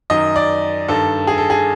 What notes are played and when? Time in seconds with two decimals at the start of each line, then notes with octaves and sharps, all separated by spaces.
0.10 F#2 D#3 D#5
0.36 D5
0.88 G2 D#3 A4
1.27 G#4
1.38 A4
1.50 G#4